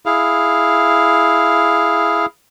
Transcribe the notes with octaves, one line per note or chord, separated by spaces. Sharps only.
E4 G#4 F5